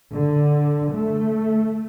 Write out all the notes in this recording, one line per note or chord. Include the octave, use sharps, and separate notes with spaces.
D3
A3